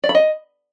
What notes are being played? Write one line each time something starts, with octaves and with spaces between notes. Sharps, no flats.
D5
B5
D#5